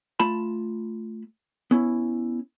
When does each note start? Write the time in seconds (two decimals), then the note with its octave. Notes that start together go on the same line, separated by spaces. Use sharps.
0.20 A3 F4 A5 B5
1.71 B3 C#4 E4